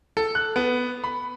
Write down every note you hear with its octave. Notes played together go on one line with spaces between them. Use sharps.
A4
F#6
B3
B5